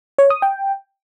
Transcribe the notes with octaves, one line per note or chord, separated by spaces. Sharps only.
C#5
D#6
G5